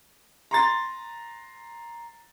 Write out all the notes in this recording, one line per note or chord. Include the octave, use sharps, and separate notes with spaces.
A#5 C6 A6